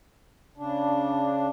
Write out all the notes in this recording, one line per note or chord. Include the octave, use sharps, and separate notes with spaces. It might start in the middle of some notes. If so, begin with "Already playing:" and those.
C#3 D4